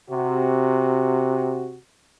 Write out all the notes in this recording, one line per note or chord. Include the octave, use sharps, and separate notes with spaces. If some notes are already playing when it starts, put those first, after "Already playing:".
C3 F#4